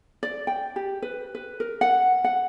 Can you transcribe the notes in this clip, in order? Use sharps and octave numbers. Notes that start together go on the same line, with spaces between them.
D5
G5
G4
B4
B4
A#4
F#5
F#5